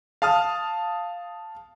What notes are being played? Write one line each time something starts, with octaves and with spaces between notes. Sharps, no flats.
F5 A5 D#6 F6